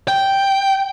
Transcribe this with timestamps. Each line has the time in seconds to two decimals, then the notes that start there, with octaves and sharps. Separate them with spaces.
0.08 G5